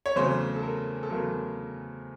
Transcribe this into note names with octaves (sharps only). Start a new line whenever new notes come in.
C#5
E2 C#3 F#3 A3 C5
A4
A#4
A4
E2 C#3 F#3 A3 A#4